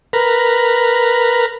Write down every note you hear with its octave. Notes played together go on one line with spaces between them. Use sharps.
A#4 B4